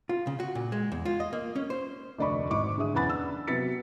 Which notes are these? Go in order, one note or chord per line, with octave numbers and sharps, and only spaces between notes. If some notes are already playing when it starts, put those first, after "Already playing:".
F4
C#3
F#4
A#2
G#3
E2
F4
D#5
A#3
C#4
C5
F1 D2 D5 D#5 B5 C#6
G#1 G#2 C#6 D6
D3 G#4 E5 D#6
F#1 E2 C#4 F#5 B5 A6
D4 E6
C3 F#3 B3 A6 B6 C#7